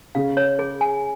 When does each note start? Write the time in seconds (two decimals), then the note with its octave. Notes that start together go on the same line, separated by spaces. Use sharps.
0.15 C#3 F5
0.37 C#5
0.59 G#4
0.81 G#5